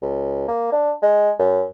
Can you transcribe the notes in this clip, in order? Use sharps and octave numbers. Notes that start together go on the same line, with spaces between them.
C#2
A#3
D4
G#3
F#2